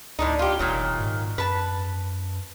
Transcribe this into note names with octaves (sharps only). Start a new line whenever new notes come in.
D2 A2 D4 D#4
F4 G4
F1 A#2 D#3 F#3
G#2
F#2 B4 A5